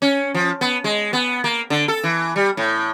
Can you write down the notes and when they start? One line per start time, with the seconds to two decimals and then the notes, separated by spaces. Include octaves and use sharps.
0.02 C#4
0.34 F3
0.61 B3
0.84 G#3
1.13 B3
1.44 A#3
1.70 D3
1.88 A4
2.04 E3
2.36 G3
2.57 A2